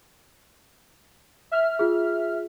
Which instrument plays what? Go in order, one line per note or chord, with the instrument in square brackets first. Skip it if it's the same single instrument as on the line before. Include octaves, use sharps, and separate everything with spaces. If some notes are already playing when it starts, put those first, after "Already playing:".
[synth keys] E5 F6
[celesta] F4 G#4